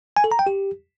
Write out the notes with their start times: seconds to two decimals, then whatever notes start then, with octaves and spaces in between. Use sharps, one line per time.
0.17 G#5
0.24 A4
0.32 A#5
0.39 G5
0.47 G4